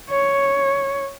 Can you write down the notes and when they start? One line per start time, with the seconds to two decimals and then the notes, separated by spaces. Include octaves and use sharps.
0.10 C#5